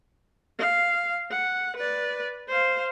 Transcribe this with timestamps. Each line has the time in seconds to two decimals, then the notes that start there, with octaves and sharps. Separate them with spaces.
0.59 F5
1.31 F#5
1.76 B4 D5
2.48 C5 F5